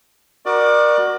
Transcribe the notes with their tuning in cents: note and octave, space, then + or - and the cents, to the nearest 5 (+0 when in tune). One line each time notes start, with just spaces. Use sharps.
F#4 +0 A#4 +20 D5 +25